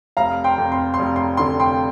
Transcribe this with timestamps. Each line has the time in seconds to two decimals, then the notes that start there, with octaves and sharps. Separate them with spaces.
0.17 F1 F5 A#5
0.44 G5 C6
0.58 F2
0.72 C6
0.94 C6
0.99 F1
1.16 C6
1.37 D3 C6
1.60 G5 C6